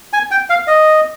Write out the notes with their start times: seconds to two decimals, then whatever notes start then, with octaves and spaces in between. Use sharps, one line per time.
0.13 G#5
0.31 G5
0.50 F5
0.67 D#5